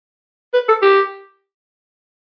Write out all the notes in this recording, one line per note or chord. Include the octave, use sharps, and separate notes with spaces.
B4
A4
G4